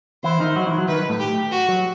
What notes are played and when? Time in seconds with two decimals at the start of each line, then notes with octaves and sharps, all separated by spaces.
0.24 E3 E4 C5
0.40 D#3 D#4
0.56 F#3 F#4
0.67 E3 E4
0.78 F#3 F#4
0.88 D#3 D#4 B4
1.09 A2 A3
1.20 G4
1.51 F#4
1.68 F#3